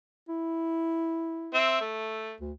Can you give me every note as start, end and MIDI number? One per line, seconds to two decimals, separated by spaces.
0.29 1.60 64
1.54 1.80 60
1.54 1.80 76
1.81 2.34 57
2.41 2.52 38